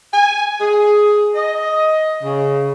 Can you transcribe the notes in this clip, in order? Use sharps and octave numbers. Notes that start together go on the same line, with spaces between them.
G#5
G#4
D#5
C#3